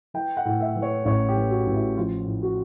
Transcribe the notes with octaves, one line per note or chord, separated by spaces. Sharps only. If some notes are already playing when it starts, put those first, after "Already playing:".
E3 G5
F#5
A2
E5
E3
C#5
A1 C#5
G4
E3
F#4
A1
E4
F3 F4
A2
F#4